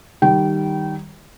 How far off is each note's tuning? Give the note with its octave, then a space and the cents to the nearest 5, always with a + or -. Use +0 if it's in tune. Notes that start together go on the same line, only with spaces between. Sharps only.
D#3 +0 G3 +0 G5 -25